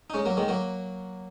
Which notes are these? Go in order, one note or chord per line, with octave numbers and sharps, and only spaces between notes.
D#4
G#3 C#4
F#3 A#3
D#3 G#3
F#3 A#3